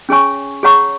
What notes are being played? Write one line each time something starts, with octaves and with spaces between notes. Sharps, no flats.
C#4 G#4 C#5 G#5 C#6
G#4 C#5 F#5 A#5 C#6